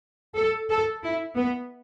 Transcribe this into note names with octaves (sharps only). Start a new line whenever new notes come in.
A4
A4
E4
B3